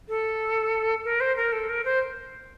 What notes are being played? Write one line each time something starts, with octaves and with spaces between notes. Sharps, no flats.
A4
A#4
C5
A#4
A4
A#4
C5